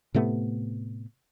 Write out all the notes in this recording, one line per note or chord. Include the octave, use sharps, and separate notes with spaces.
A2 C3 A3 B3